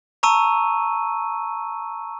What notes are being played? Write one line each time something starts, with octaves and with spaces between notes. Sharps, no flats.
A5 A#5 C#6 E6 D#7